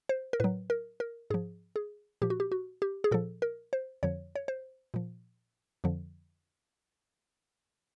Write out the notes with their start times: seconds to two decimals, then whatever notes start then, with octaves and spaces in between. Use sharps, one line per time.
0.09 C5
0.33 A#4
0.40 A2 F#3 B4
0.70 A#4
1.00 A#4
1.30 G#2 F3 G#4
1.76 G#4
2.22 A#2 F3 G4
2.30 F#4
2.40 G4
2.52 F#4
2.82 G4
3.04 G#4
3.11 A#2 F3 A4
3.42 A#4
3.73 C5
4.03 F2 D3 F3 C#5
4.36 C#5
4.48 C5
4.94 A#2 F3
5.84 F2 D3 F3